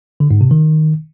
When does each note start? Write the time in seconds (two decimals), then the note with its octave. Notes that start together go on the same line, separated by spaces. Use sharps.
0.20 D3
0.31 G#2
0.41 C3
0.51 D#3